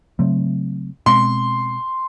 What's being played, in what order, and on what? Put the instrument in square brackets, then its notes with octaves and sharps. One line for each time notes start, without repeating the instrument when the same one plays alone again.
[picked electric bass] C#3 F#3 A3 C4
[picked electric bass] B2 G#3 C4 [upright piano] C6